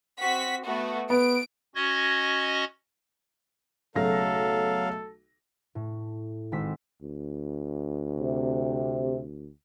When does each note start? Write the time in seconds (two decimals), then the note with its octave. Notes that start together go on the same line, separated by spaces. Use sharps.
0.19 C4 F#4 B6
0.64 A3 B3 F#4
1.10 B3 D7
1.75 C#4 F#4 D#5 G#6 A#6
3.95 B1 C#3 F#3 A3 A4 F5 A#6
5.75 A2
6.52 G#1 G#3 C4 E6 B6
7.02 D2
8.18 C3